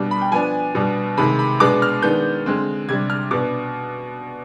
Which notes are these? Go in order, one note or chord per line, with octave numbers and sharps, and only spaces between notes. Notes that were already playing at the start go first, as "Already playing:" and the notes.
Already playing: B2 G3 D4
B5
G5
F3 B3 D4 G#5
B2 G3 B3 D4
C3 D#3 G#3 B5
B5
B2 G#3 B3 D4 D6
F6
D#3 G#3 B3 D4 G6
D3 G#3 C4
C3 G3 D4 G#6
F6
B2 B3 D4 D6